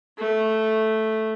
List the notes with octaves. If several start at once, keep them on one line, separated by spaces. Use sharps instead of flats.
A3